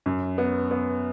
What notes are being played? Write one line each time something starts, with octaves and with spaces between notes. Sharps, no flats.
F#2
B3
B3